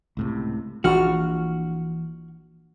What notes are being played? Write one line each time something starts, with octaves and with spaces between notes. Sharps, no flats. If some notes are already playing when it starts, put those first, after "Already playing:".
C#2 A2 C3
A#1 E3 D4 F#4 F6